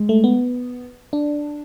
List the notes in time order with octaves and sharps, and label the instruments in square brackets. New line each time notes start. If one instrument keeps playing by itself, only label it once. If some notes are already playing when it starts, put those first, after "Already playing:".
Already playing: [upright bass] G#3
[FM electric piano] A3
B3
D4